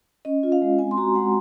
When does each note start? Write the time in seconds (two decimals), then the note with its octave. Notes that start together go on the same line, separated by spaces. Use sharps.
0.25 C#4 D#5
0.43 F4
0.52 F5
0.62 G#3
0.79 C4 G#5
0.91 C6
0.97 F#4 A#5
1.15 G#3 F#5